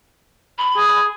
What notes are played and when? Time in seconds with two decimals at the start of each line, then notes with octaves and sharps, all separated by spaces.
0.58 B5
0.77 G#4